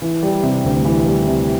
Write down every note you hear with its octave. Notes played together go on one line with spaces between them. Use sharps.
E3
G3
C3
D2
E3
G3
C3